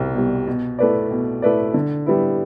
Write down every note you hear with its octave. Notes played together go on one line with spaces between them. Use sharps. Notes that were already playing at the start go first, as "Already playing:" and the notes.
Already playing: C2 B2 G3
B2 G3
B2
A3 E4 B4 D5
B2
A3 E4 B4 D5
D3
G3 B3 E4